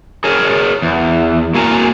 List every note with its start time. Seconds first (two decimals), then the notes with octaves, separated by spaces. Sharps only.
0.24 G#4 A#4 C#5
0.82 E2
1.54 A#3 F#4 A#4 G#5 A#5